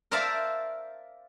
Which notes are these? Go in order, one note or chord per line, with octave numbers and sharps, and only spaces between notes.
A#4 C5 D5 E5 F5 A5